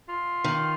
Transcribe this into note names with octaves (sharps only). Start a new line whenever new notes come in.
F4
D#3